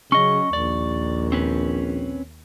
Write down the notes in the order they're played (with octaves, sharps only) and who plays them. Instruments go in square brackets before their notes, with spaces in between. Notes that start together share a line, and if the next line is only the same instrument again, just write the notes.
[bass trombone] C#3 [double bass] F#3 [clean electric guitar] C#4 D#5 [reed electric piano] C#6
[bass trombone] A#1 [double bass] D#2 [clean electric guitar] D5
[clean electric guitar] C4 C#4 B4